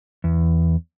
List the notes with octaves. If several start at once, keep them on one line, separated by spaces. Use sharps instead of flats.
E2